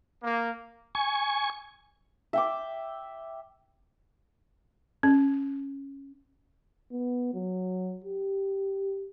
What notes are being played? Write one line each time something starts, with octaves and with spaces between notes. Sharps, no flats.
A#3
G#5 C#6
E5 G5 D6
C#4
B3
F#3
G4